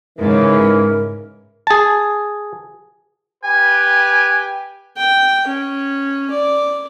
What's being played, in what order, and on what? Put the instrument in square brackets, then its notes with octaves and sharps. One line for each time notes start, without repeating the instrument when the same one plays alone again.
[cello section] G#2 C#3 [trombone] E3 [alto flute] A#4
[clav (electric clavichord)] G#4 A5
[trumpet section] G4 B4 G5 [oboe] G#5
[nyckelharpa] G5
C#4
D5